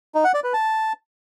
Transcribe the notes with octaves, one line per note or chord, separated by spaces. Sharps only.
D#4
F#5
D5
B4
A5